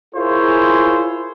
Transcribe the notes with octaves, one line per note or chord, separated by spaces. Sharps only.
E4 F4 G#4 A#4 C5 C#5